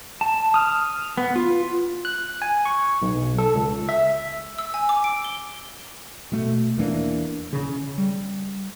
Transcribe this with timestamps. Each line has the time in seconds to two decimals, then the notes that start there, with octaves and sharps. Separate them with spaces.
0.21 A5
0.54 D#6 F6
1.17 B3
1.36 F4
2.05 F#6
2.42 G#5
2.65 C#6
3.02 B1
3.38 A4
3.55 C#2
3.89 E5
4.58 E6
4.74 G#5
4.89 D6
5.04 D7
5.25 G7
6.32 B2 A3
6.77 E2 E3 A#3 D4
7.53 C#3
7.98 G3